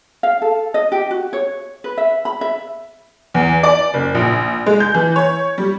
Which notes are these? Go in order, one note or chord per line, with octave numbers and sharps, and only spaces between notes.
F5
A4
D#5
G4
F#4
C#5
B4
E5
B5
E5
E2
D5
F#1
A#1
G#3
G6
E3
C#5
G3